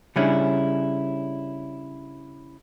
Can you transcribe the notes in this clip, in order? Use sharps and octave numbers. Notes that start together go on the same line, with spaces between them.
C#3 G3 C#4 D4 E4 G#4